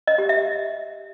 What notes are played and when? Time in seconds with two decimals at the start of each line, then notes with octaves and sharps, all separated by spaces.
0.07 D#5
0.18 G4
0.29 E5